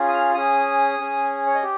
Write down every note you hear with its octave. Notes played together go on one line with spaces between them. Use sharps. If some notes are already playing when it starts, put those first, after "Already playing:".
Already playing: C#4 F4 G#4
D#6
F6
C#4 G#4 D#6
C#4 G#4
C#5
D#5
G4